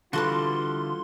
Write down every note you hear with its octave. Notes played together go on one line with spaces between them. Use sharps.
D3 E3 G3 F4 F#4 A4 B4 C6